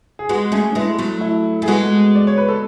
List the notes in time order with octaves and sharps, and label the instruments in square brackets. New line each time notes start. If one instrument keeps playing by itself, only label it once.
[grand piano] G#4
[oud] G#3 B3 [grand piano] F#4
[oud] A3 C#4 [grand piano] G#4
[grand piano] D4
[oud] G#3 B3 [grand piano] E4
[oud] F#3 A3
[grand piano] E4
[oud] A3 [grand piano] G#4
[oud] G#3 B3 [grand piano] F#4
[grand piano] D5
C#5
B4
A4